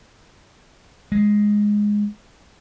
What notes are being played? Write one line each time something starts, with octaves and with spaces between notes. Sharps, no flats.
G#3